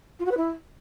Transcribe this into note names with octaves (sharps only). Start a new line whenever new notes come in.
F4
F#4
B4
E4